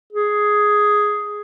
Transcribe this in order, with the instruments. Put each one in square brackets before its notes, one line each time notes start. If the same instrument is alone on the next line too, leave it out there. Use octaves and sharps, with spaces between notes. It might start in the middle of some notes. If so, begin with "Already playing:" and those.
[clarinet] G#4